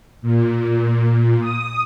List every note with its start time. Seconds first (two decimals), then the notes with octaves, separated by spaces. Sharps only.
0.22 A#2
1.40 D#6